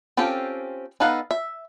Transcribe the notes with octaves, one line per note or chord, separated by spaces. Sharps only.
C4 C#4 F4 G4 A4
B3 D#4 A4 B4 F5
E5